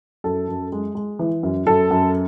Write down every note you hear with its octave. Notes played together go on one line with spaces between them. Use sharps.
F#2 A4
F#2
G#3
G#3
E3
F#2
F#2 A4
F#2